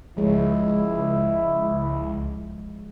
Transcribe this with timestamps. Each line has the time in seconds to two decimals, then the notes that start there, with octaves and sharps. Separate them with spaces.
0.17 C#2 F3 G#3 E4 C#5